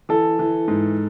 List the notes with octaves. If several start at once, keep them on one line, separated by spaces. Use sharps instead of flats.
E3 A4
E3
G#2